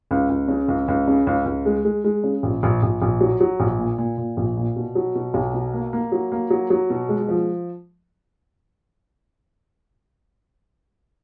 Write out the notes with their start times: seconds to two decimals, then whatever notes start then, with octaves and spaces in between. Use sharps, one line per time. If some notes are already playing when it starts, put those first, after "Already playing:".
0.11 C#2
0.29 C#2
0.48 C#3
0.68 C#2
0.88 C#2
1.08 C#3
1.27 C#2
1.46 C#2
1.66 G#3
1.85 G#3
2.04 G#3
2.24 C#3
2.43 A#1
2.63 A#1
2.83 A#1
3.02 A#1
3.21 F#3
3.41 F#3
3.60 A#1
3.79 A#2
3.98 A#2
4.18 A#2
4.37 A#1
4.57 A#2
4.76 B2
4.95 F#3
5.15 B2
5.34 B1
5.54 B2
5.73 A#3
5.93 A#3
6.12 F#3
6.32 A#3
6.50 F#3
6.70 F#3
6.90 B2
7.09 G#3
7.29 F3